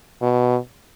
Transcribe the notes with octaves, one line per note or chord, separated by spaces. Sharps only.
B2